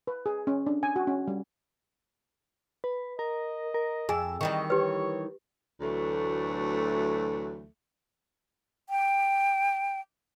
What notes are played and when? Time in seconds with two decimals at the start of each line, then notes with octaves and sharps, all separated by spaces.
0.07 B4
0.26 G#4
0.47 C#4
0.67 D4
0.83 G#5
0.96 F#4
1.07 C#4
1.28 G3
2.84 B4
3.19 A#4 D#5
3.74 A#4
4.09 F2 G#4 G#5 E6
4.41 D#3 E3 G3 D#5 C#6
4.70 G4 B4 C#5
5.81 D2 E3 F#3 A3
8.90 G5